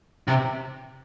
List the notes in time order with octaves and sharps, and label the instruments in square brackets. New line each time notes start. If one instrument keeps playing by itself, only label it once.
[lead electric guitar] C3